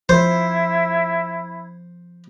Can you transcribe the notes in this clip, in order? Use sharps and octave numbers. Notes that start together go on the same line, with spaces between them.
F3 E4 C5